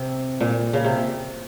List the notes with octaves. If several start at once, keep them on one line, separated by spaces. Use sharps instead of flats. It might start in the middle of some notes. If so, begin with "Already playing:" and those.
Already playing: C3
A#2
C#3
C3